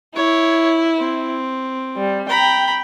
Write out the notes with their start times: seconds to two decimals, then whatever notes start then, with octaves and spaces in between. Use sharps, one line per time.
0.16 E4 C#5
0.98 C4
1.97 G3
2.29 G5 A#5 B5